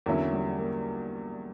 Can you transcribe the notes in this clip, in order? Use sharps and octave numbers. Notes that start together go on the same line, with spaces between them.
E2 D3 F#3 A#3 C#4 E4
G3
A#3